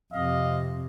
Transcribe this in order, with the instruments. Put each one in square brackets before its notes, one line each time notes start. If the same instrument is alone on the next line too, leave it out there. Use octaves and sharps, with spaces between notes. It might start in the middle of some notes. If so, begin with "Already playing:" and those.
[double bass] F2 C3 [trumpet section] D#5 F5